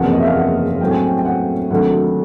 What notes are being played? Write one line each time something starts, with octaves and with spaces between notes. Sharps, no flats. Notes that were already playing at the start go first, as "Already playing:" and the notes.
Already playing: F#1 E2 C3 F3 A#3 F#5
D#5
E5
F5
F#5
A2 F#3 A3 C4 G5
G#5
G5
G5
F#5
D2 C3 D#3 F#3 A3 F#5